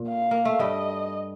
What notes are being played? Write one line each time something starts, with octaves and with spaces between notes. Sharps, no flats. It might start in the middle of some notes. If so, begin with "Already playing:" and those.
Already playing: A#2
F5
A#3
A3
G2 G3 D#5